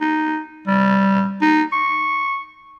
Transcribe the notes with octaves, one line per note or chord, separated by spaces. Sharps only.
D#4
G3
D#4
C#6